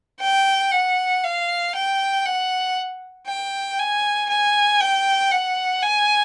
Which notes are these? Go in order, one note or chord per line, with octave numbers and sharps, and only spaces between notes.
G5
F#5
F5
G5
F#5
G5
G#5
G#5
G5
F#5
G#5